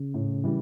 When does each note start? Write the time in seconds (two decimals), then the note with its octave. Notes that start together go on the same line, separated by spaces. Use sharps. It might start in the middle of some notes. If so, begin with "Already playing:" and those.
Already playing: C#3
0.14 A2
0.44 E3 G3